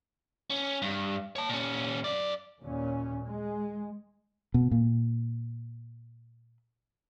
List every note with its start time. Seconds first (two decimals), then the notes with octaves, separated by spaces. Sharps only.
0.50 C#4
0.82 G2
1.36 C#5 A5
1.49 A#2 C#4
2.04 F#2 D5
2.61 D#2 A#2 C#4
3.24 G#3
4.54 B2
4.71 A#2